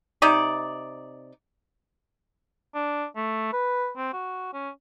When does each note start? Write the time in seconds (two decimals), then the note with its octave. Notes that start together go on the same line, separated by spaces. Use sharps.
0.22 C3 D#4 D5
2.75 D4
3.16 A3
3.53 B4
3.97 C4
4.13 F#4
4.53 C#4